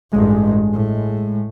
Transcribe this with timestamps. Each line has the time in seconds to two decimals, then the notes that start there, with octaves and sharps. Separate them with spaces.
0.13 A1 G2 G#3
0.73 A2